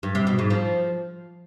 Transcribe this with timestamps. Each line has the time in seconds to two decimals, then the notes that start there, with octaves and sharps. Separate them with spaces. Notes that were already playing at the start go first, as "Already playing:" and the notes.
0.03 G2
0.15 C3
0.27 B2
0.39 G#2
0.50 F3